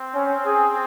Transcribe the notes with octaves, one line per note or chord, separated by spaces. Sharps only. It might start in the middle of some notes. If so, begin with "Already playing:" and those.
Already playing: C4
C#4
G#4